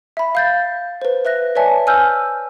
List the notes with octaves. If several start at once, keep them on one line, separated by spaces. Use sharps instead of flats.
E5 B5
F5 G6 A6
B4 C5
B4 E5 F#6 A#6
B4 C#5 D5 E5 G#5 A5
G#5 E6 F6 G6